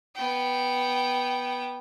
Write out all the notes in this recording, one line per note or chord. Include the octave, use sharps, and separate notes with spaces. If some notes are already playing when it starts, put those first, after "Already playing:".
B3 G5